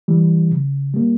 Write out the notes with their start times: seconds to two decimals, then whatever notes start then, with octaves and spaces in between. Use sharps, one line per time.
0.08 E3 G3
0.51 C#3
0.94 G3 A#3